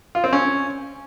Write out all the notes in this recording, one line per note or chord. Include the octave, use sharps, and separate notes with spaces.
F4
C4
C#4